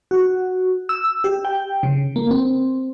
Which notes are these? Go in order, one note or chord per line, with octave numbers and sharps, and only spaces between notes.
F#4
E6
G4
G5
C#3
A#3
C4